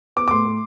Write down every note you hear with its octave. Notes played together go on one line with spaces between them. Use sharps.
B3 D6
D6
A2 C6
A2